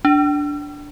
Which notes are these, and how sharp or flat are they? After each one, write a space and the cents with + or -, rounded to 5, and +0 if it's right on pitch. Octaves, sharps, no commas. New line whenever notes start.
D4 -5